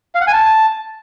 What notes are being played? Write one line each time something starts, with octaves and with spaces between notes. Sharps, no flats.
F5
F#5
G#5
A5